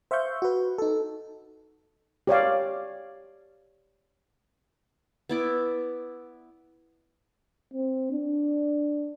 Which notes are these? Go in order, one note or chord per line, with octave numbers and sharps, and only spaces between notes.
C5 E5 F5 C#6 G6
F#4 B4
D#4 A4
G4 C#5 D5 F5
B3 E4 D5
C4
D4